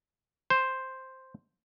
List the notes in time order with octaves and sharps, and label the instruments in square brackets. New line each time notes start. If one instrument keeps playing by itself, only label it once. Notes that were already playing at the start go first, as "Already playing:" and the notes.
[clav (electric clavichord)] C5